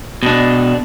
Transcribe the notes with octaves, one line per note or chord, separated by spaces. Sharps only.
B2 D4